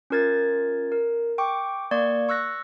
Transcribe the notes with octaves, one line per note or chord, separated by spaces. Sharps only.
C#4 F4 A#4 G#6 A6
A#4
G5 C#6 D6
A#3 D5 C#6 G#6
C#6 E6 F#6 A#6